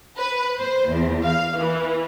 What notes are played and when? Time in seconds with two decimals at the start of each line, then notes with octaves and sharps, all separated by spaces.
0.17 B4
0.58 C5
0.89 E2
1.25 F5
1.57 E3